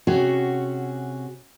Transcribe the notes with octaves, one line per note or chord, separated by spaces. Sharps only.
C3 C#4 F#4 G#4